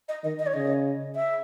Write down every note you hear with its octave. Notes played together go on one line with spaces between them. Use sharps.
D#5
D#3 D#5
D#5
C#5
C#3 D#5
E5